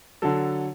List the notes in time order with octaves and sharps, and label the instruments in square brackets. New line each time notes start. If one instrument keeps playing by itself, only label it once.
[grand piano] D3 F#3 A4